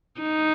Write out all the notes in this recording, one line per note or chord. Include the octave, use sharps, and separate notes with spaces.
D#4